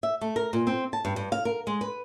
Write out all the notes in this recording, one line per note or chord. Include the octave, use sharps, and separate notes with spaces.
E5
A3
A#4
A#2
C4
A5
G2
G2
F5
A#4
G#3
B4